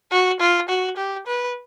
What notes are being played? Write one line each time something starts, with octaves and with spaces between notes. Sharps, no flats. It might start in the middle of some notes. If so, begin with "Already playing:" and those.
F#4
F4
F#4
G4
B4